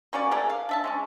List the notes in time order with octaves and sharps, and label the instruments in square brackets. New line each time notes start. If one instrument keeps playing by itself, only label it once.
[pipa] A#3 C#4 F#4 D5
A3 G#4 A#4 D5
F5
D4 E5 A5
G#3 C#4 D4